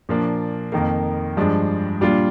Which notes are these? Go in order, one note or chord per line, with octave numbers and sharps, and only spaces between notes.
A#2 F3 A#3 D4
F2 D#3 A#3
G2 F3 G#3 D4
A#2 G3 D4 F4